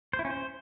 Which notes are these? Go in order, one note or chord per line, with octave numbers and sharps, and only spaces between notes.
C5
E4
C#4
C5